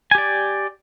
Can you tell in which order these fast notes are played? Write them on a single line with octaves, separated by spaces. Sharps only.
G#5 G4 D5